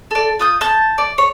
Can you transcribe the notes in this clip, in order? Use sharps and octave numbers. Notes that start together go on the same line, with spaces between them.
A4 D5
F4 D#6 G6
A5 G6
D5
C#5